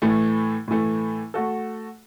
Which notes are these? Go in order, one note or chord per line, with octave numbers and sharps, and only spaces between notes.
A2 E3 A3
A2 E3 A3
A3 F#4 A4